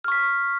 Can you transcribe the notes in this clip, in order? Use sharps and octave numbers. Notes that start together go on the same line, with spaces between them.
C#6 F6 B6